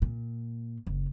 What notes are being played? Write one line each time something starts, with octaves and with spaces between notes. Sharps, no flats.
A#2
F#1